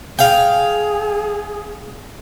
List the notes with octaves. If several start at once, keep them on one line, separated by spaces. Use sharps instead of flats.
G#4 F5 G5